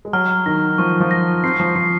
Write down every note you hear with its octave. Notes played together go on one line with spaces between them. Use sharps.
G#3
F#3 F6
D#3 A#6
F3 C#6
F3
A#6
C4 C7
F3
F3 C7